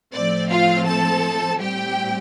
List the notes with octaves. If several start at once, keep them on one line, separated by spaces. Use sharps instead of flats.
A2 F3 A3 C4 D5
F4 F5
A4 A5
A2 G3 C4 G4 G5